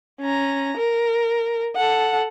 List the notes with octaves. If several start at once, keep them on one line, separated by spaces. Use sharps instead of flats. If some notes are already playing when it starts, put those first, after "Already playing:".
C#4 A#5
A#4
A4 F#5